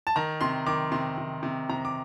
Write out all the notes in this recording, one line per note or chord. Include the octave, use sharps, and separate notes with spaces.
A5
D#3 A#5
C3 C6
D#3 D6
C3 C6
C3
C3
C3 A#5
D6